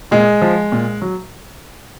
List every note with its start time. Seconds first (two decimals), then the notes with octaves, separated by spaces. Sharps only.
0.11 A#2 G#3
0.42 F3
0.72 A#2
1.02 F#3